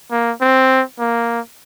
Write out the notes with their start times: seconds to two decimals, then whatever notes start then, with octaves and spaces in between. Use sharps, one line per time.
0.11 A#3
0.41 C4
0.99 A#3